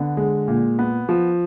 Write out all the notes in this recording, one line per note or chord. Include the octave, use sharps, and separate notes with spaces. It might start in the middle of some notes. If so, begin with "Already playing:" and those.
Already playing: D3 B3
G#3
A#2
B3
F3